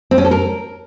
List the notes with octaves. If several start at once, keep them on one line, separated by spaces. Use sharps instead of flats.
C4
C#4
A4
A#4